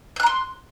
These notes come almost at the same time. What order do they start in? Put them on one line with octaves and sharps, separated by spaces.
G6 F#6 A#5 C6